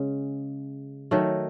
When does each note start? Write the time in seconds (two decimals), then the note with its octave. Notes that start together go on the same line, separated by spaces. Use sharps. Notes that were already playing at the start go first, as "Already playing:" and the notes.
Already playing: C#3 G#3 C#4
1.11 D#3 F#3 A3